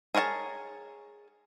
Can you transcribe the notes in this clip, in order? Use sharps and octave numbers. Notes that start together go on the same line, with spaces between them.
G#4 A#4 C#5 F#5 A5